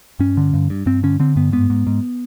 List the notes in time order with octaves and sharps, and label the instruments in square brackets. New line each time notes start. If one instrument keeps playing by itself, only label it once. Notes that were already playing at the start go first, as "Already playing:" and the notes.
[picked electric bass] G2 C#4
D3
G2
G2
G2 C4
D3 C#4
D3 C4
G2 B3
G#2 B3
G#2
G#2